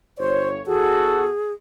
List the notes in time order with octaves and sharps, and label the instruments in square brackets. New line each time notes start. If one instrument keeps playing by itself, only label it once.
[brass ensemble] G1 C#5 [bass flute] C5
[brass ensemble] E2 F#4 [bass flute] G#4 [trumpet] A4